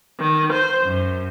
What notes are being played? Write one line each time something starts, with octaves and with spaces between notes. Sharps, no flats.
D#3
C5
F#2